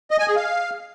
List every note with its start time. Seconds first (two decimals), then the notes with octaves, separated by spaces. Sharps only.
0.11 D#5
0.19 G#5
0.28 G#4
0.36 F5